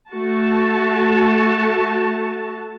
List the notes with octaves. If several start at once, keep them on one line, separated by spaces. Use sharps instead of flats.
A3 F#4 A5